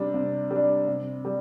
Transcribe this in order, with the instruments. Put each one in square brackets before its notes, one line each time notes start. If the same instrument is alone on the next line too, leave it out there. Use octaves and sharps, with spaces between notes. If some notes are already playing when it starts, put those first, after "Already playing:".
Already playing: [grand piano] C3 G3 D4
C3
G3
D4
C3
G3